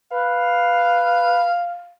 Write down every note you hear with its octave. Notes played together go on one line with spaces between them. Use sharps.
B4 F5